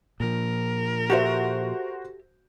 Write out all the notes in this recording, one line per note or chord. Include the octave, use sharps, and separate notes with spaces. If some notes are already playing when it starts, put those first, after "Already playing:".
A#2 F3 A#4
F#4 G4 A4 C5 E5